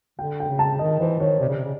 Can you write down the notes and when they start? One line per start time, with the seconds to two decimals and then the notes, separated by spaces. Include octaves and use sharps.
0.19 D3 G5
0.40 G5
0.49 C#3
0.59 A5
0.79 D#3 D#5
0.99 E3 C5
1.20 D#3 C#5
1.40 C3 D5
1.49 C#3
1.57 C3
1.64 C#3